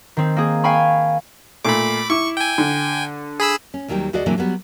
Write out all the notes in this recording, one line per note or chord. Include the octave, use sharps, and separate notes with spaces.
D#3 C4
A#3 G#4
F5 G5 G#5 B5 C#6
A#2 A3 B5 D6
E4 C#6 D6
G5 G#5
D3
G#4 B5 E6
C#4
D#2 D#3 F#3 G3 G5
D2 F#4 G#4 D5 D#5
A#2 D3 E3 F#3 A#3 C4
F#3 G3 B3